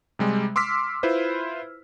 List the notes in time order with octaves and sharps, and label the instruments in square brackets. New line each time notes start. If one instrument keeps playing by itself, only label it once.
[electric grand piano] C3 G3 G#3
C6 D6 E6 F6 B6
E4 F4 B4 C5